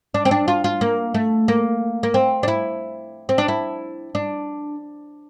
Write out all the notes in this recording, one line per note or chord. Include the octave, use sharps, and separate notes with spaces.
D4
C4
D4
F4
F4
A#3
A3
A#3
A#3
C4
D4
E4
C4
D4
E4
D4